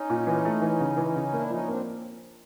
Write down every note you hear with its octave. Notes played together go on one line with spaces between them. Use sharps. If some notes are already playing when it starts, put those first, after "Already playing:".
Already playing: C#4 D#4
A#2
E3
A3
E3
C#3
E3
C#3
A#3 D4 E4
F3 C#4 D#4
A#3 C4 D4